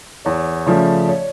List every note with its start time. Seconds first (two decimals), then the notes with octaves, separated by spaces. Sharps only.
0.25 E2 C#5
0.66 C#3 F3 A3 D5
1.08 C#5